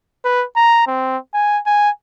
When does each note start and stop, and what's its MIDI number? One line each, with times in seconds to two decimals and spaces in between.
0.25 0.44 71
0.56 0.82 82
0.87 1.17 60
1.33 1.59 80
1.66 1.90 80